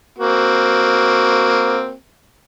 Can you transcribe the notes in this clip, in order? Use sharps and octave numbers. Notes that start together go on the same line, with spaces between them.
A#3 C4 F#4